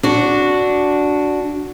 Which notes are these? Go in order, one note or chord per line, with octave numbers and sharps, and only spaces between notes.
D4 F#4